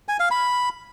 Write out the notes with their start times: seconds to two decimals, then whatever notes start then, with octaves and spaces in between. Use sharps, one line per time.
0.08 G#5
0.20 F5
0.31 B5